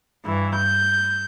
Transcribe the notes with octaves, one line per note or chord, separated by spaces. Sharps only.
G2 E3
G6